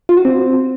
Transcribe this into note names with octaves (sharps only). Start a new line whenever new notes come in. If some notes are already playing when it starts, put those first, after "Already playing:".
F4
F#4
C4